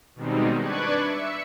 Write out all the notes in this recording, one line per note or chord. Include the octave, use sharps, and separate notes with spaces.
B2 D#3 G3 G#3 C4 D#4
D4 B4 D5 C#6 F#6 G#6
E5 C#7